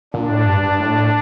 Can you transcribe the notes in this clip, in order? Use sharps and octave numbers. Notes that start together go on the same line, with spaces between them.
A#2 D4
A2
G2
G2
A2